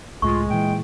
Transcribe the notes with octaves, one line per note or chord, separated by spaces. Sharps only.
C#2 A2 G#3 F4 C#6
A#2 E3 G5